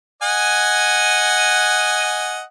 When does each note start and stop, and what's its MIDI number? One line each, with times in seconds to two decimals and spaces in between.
0.22 2.42 75
0.22 2.42 78
0.22 2.42 80